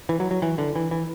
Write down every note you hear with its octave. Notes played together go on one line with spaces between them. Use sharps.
E3
F#3
F#3
E3
D3
E3
E3